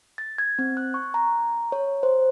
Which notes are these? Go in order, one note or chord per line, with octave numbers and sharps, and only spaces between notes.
A6
G#6
C4
F#6
C#6
A#5
C#5
C5